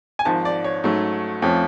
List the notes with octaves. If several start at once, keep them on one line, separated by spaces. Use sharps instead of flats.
G#5
G#1 G#2 F3 A5
D5
C#5
G#2 F#3 A3 C#4
F2 F3 A3 C#4